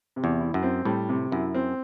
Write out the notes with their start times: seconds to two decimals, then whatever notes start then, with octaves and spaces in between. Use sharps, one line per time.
0.16 C3
0.24 E2
0.40 E4
0.54 F#2
0.63 C4
0.85 A2 G3
1.09 C3
1.31 F#2 E4
1.54 C4